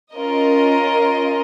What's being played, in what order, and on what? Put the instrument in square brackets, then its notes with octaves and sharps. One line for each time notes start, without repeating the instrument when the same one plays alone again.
[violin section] C#4 F4 A#4 D#5